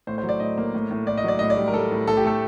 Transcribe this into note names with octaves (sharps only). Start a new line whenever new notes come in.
A2 C5
C5
F#3
D5
A2 D#5
A#3
A2
A2
A2 D5
D#5
F#3 D5
A2 D#5
D5
G3
A#4
G3 A4
A2
A2 A4
G4
A3 A4